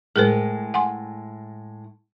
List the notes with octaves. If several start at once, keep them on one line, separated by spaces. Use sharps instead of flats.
A2 G#3 G#4 A#4 C5
F#5 G#5 C6